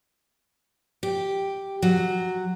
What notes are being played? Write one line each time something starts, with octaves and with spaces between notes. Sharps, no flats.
G4
F#3